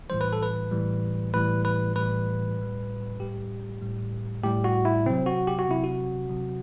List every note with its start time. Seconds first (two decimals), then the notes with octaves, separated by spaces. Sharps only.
0.10 A2 E3 G3 C5
0.21 B4
0.33 A4
0.43 B4
0.71 A2 E3 G3
1.34 A2 E3 G3 B4
1.65 B4
1.96 A2 E3 G3 B4
2.58 A2 G3
3.19 A2 G3 G4
3.81 A2 G3
4.43 A2 G3 G4
4.64 F#4
4.85 E4
5.06 C3 F#3 C4
5.26 F#4
5.47 G4
5.59 F#4
5.68 C3 F#3 E4
5.84 F#4
6.30 C3 F#3